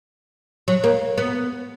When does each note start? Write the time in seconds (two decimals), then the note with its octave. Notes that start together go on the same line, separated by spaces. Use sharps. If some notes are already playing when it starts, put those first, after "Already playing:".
0.68 F#3
0.84 A#3
1.18 B3